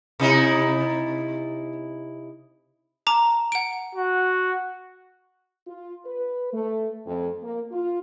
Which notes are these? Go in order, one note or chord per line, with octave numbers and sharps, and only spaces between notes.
C3 D#4 E4
A5 A#5 D6
F#5 D7
F#4
F4
B4
A3
F2
A#3
F4